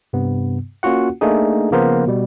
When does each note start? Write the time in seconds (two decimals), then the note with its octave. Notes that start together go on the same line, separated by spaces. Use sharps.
0.13 G2 C3 B3
0.83 A#3 C#4 F4 F#4 F#5
1.21 A3 A#3 D4 D#4 G#4
1.72 C#3 F3 A#3 B3 A#4 C5
2.07 B2 G3